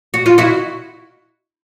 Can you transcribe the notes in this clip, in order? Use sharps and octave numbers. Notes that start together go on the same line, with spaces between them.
F#4
F4
E4 F#4